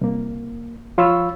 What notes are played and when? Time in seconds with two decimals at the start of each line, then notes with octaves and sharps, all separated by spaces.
0.01 C2 A#3
0.98 F3 F4 C#5 B5 C#6 E6